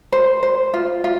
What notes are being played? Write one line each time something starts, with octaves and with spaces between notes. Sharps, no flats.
C5
C5
F4
F4